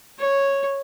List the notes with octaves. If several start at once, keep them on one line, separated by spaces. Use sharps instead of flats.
C#5